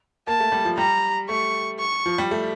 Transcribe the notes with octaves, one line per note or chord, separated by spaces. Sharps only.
A#3 A5
A3
G3
F3
G3 A#5
A3 C#6
C#6
F3
G3
A3